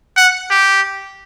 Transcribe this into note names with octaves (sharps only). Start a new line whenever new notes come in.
F#5
G4